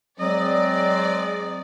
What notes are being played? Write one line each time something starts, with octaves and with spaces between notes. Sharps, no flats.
F#3 G#3 C4 D5 D#5